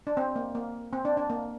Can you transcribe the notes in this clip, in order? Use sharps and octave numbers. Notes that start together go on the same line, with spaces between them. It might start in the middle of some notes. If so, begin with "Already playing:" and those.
D4
C4
A#3
A#3
C4
D4
D4
A#3